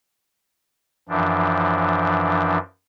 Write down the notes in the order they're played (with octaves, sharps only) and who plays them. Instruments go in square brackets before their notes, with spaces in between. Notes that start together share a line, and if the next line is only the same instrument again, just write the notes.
[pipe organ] F#2 E3 F3 D4